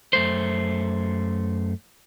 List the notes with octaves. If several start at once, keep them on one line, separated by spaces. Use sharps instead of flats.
F#2 A3 C5